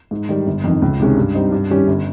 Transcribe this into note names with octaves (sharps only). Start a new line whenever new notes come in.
G#2
D#3 G3
G1
F2 D#3
C#2
C3 D#3 G#3 C#4
G2
G3 C4 D#4
G2
D#3 G3 C#4 G4
G1